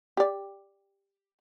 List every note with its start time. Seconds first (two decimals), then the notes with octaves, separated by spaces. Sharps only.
0.17 G4 D5